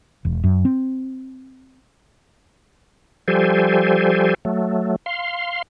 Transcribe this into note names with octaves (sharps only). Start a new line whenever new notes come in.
E1
F#2
C4
F3 G3 G4 A4 C5 G#5
F#3 A3
F5 C6